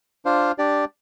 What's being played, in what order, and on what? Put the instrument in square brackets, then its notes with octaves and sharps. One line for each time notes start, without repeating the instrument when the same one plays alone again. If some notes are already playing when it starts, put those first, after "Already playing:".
[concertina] D4 F4 C5 F5
D4 G4 D5